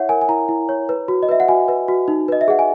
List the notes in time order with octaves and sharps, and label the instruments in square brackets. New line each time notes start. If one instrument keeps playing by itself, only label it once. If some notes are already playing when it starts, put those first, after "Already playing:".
Already playing: [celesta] E4 C#5 E5 F#5
A#4 G#5
G#5
E4 A#5
E4
C#5
B4
F#4
D#5
B4 E5
F#5
F#4 G#5
B4
F#4
D#4
B4 D#5
E5
G#4 F#5
G#5